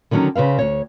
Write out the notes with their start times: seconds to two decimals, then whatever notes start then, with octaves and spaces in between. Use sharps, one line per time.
0.11 D3 D#3 F#3 A3 C#4 D#4
0.35 C#3 C4 B4 F5
0.59 D2 C#5